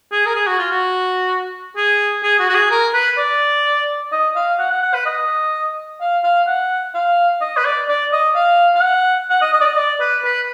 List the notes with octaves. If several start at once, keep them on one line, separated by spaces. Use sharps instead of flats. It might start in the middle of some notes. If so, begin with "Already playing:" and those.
G#4
A#4
G#4
F#4
F4
F#4
G#4
G#4
F#4
F#4
G#4
A#4
B4
D5
D#5
F5
F#5
F#5
F#5
B4
D#5
F5
F5
F#5
F5
D#5
B4
D5
D5
D#5
F5
F5
F#5
F#5
D#5
D#5
D5
D#5
D5
B4
B4